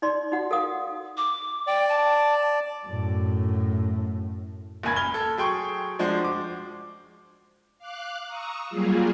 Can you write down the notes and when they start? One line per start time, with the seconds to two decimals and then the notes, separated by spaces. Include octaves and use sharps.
0.02 D#4 D5 C6
0.32 D#4 F#4 F#5
0.51 A4 A#4 F5 F#5 D#6
1.17 D6
1.67 D5 G5
1.89 A5
2.86 F#2 A2
4.83 F#1 C#2 A#3 G#5 B5 G#6
4.96 B5 F6 G#6 G7
5.14 A4
5.37 F#3 G#4 G5 C6 C#6
5.99 F3 G#3 D4 F#4 C5
6.25 D6
7.78 F5 D6 F#6
8.27 A#5 C#6 D#6 E6
8.70 F#3 G3 A#3 F4 G#4